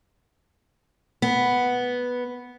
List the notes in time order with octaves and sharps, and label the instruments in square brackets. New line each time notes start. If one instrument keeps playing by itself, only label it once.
[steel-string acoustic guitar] B3